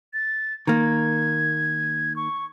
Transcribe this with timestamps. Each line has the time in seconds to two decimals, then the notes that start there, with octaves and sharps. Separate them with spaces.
0.14 A6
0.67 D#3 A#3 G#6
2.16 C#6